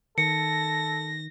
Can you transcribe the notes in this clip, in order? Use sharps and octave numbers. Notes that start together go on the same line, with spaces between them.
D#3 A4 A#6 C#7